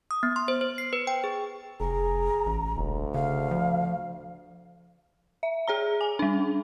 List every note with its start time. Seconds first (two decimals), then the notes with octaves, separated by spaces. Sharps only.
0.11 D#6
0.23 B3
0.36 C6
0.48 C5
0.61 C5
0.78 C7
0.93 B4
1.07 G5
1.24 G#4
1.80 F1 G#4 A#5
2.46 A1
2.77 E1 D2
3.14 C#3 F5
3.51 F3
5.43 E5
5.67 G#4 C#5 A#5
6.01 G#5
6.19 G3 D4